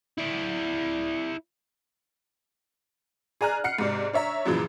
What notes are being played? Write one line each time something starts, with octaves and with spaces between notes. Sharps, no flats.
E4 D5
G#4 D5 G#5 A#5 F6 F#6
F#5 F6 C7 C#7
G#2 C3 D5
D4 C#5 E5 A#5
F#2 A#2 C#3 E3 F3